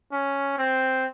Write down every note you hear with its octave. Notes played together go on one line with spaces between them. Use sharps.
C#4
C4